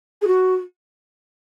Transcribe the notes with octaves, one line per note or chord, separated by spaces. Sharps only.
G#4
F#4